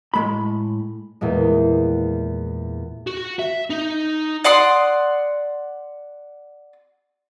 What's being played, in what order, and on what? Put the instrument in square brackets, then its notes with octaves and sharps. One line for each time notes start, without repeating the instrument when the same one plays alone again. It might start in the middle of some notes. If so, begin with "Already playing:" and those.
[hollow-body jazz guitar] A2 G#3 B5
[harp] E2 A#2 G#3
[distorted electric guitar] F#4
E5
D#4
[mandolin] D5 F#5 C6 D#6